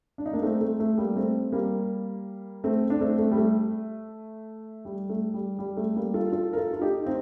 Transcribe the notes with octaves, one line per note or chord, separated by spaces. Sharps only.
D4
D#4
A#3 D4
A3 C4
A3
A3
G3 A#3
A3 C4
G3 A#3
A3 C4
D4
A3 C4
A3
G3
A3
G3
A3
G3
G3
A3
G3 A#3
F4 A4
F4 A4
A#4
F4 A4
F4
D#4 G4
C4 D#4